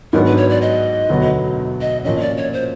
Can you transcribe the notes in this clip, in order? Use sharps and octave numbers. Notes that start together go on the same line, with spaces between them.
G#2 D#3 F#3 B3 D4 A#4
B4
C#5
D5
D#5
E1 D2 D3 F#3 B3
D#5
A#2 F3 A#3 C#4 D#5
D5
C#5
C5